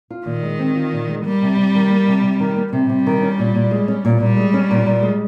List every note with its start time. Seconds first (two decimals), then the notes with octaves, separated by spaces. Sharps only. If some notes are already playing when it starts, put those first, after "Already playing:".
0.10 F4
0.26 A#2 D#3
0.43 G#3
0.59 C4
0.75 F4
0.92 A#2
1.09 G#3
1.25 G3 A#3
1.42 C3
1.57 C3
1.75 D#3
1.90 A#3
2.07 C3
2.23 C3
2.40 D#3
2.56 A#3
2.73 C3 G3
2.89 C3
3.06 D#3
3.22 C#4
3.39 A#2
3.56 A#2
3.71 G#3
3.88 C#4
4.05 A#2
4.21 A#2 G3
4.37 G#3
4.54 C#4
4.71 A#2
4.86 A#2
5.03 G#3